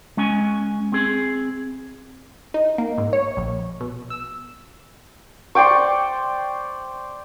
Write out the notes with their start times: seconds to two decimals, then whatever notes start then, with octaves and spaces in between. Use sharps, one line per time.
0.17 G#3 C#4 G#5
0.92 C4 G#4
2.54 D#4
2.78 A#3
2.98 G#2
3.13 C#5
3.37 A#1
3.81 B2
4.10 E6
5.55 C5 D5 G5 C#6